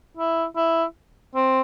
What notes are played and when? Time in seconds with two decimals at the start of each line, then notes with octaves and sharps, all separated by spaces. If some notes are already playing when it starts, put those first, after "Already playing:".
0.17 E4
0.56 E4
1.35 C4